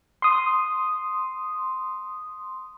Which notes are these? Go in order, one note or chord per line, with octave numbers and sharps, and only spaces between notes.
C6 D#6